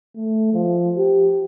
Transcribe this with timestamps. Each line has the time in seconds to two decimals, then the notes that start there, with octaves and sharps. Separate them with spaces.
0.16 A3
0.53 F3
0.97 G4